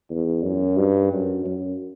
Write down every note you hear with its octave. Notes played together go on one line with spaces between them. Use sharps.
E2
F#2
G2
F#2
F#2